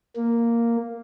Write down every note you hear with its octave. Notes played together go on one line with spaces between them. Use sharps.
A#3